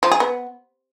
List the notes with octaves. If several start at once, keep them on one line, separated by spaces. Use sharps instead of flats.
F3
G#4
B3